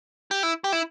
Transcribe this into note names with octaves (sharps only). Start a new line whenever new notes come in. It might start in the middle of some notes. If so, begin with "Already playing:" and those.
G4
E4
G4
E4